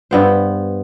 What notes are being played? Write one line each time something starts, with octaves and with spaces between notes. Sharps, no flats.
G2 B3 C5